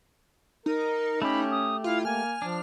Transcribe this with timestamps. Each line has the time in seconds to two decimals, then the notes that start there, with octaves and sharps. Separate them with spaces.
0.66 D#4 A#4
1.22 A3 C#4 G4 B5
1.51 D#6
1.84 E4 F4 F5
2.05 A#3 G#5 F6
2.42 F3 D4